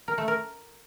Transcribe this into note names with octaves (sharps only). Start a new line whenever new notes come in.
A#4
A3
A#4